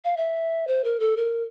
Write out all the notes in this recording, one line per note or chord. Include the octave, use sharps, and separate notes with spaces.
F5
E5
C5
A#4
A4
A#4